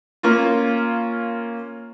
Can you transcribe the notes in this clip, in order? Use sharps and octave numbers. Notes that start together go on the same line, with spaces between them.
A#3 C#4 F4